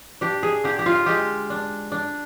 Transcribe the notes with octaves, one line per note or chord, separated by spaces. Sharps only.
D4 G4
G#4
D3 G4
G4
F4
G#3 G4
D4
D4